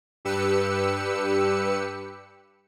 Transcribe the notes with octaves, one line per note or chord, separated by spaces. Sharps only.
G2 G4 B4 E6 C#7